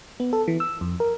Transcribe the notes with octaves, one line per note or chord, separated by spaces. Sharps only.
B3
A4
E3
E6
F2
A#4